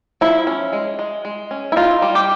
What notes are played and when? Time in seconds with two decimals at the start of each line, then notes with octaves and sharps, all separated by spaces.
0.21 F3 E4
0.47 C#4
0.73 G#3
0.99 G#3
1.25 G#3
1.51 C#4
1.72 E4
1.76 D#4 F4
2.02 G3
2.15 G4